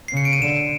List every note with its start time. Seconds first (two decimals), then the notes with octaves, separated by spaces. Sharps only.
0.08 C7
0.13 C#3 C#7
0.25 D7
0.33 D#7
0.41 D3 E7